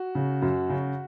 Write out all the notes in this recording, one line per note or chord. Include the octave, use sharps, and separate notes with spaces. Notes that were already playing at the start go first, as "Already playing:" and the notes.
Already playing: F#4
C#3
F#2
C#3